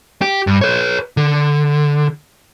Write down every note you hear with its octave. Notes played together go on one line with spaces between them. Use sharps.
G4
G2
B4 C#5
D3